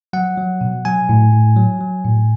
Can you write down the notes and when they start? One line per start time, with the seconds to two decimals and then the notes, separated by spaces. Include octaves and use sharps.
0.13 F#3 F#5
0.37 F#3
0.61 B2
0.85 F#3 G#5
1.09 A2
1.33 A2
1.57 F#3
1.81 F#3
2.05 A2